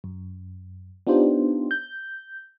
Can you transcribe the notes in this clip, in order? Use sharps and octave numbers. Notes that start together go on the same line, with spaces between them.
F#2
B3 D4 D#4 F4 G4 C5
G6